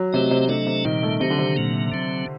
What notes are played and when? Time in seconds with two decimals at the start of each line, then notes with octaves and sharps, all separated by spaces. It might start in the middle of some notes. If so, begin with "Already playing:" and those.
Already playing: F#3
0.13 C3 A3 C4 G4 C5 D#5
0.31 C3
0.49 C3 F#3 A3 D4 A4 D#5
0.67 C3
0.84 A#2 D#3 G3 C4
1.03 A3
1.20 C3 D#3 F#3 C4 G4
1.30 D3
1.38 C3
1.57 A#2 F#3 A#3
1.92 D3 F#3 C4